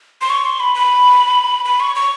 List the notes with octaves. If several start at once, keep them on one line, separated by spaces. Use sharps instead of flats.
C6
C#6
C6
B5
B5
B5
C#6
C#6